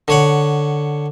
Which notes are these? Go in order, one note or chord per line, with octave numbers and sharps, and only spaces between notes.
D3 C#5 F#5